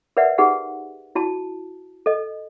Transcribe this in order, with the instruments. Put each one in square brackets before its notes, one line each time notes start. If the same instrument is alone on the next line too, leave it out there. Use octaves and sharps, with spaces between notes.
[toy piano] A#4 B4 D5 E5 F#5
D#4 G4 G#4 B4 F#5
E4 F#4 A5
A4 D#5